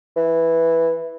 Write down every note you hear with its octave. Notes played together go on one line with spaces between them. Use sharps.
E3